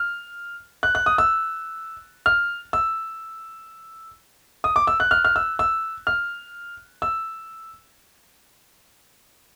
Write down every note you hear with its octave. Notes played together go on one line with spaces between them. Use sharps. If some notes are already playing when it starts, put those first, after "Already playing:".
Already playing: F6
F#6
F#6
D#6
E6
F6
E6
D#6
D6
E6
F#6
F6
F6
E6
E6
F6
E6